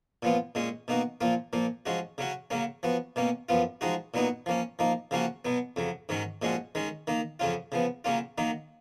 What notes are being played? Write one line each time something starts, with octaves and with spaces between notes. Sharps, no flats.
A#2 F3 B3 F4
A#2 G#3 C#4
B2 A#3 D#4 F#4
A#2 F3 A#3 F4
A#2 F3 A#3
F3 G#3 C#4 F#4
C#3 F#3 C#4 F#4
C#3 F#3 A#3 C#4
F3 B3 F#4
B2 A#3 C#4
F#2 F3 B3 F4
F3 G#3 D#4 F#4
A#2 F#3 B3 D#4 F#4
F3 A#3 C#4
F3 A#3 D#4
C#3 F3 A#3 C#4 F#4
B2 F#3 B3
F2 C#3 F#3
G#2 D#3 F#3 C#4
A#2 F3 G#3 C#4 F#4
D#3 G#3 C#4
D#3 A#3 D#4
F2 C#3 F#3 C#4 F4
C#3 F3 B3
C#3 F#3 A#3 C#4 F4
D#3 F#3 A#3 D#4